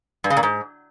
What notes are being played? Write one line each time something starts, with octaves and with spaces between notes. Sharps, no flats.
G2
C#3
A#2
G#2